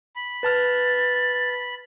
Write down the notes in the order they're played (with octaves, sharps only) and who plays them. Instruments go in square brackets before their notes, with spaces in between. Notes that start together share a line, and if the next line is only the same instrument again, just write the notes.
[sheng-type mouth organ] B5
[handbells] B4 A5 F6 [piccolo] A6